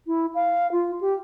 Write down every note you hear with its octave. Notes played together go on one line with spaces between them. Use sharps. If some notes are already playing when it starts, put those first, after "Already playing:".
E4
F5
F4
G4